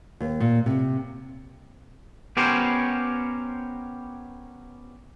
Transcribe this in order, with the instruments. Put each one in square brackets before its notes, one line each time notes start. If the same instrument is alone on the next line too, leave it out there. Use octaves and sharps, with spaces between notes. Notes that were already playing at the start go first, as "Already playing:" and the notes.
[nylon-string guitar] D#2
A#2
C3
[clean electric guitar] B3 C#4 G4 A#4 C5 C#5